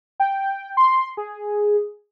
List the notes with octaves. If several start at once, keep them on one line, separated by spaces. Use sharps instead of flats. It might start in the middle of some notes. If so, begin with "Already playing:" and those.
G5
C6
G#4